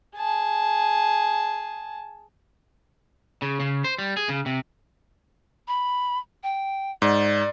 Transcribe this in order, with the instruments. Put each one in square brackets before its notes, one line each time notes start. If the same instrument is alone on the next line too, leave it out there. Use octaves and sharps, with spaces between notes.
[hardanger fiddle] G#4 A5
[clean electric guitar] C#3
C#3
C5
G3
G#4
C#3
C3
[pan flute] B5
G5
[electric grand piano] G#2 [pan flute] D5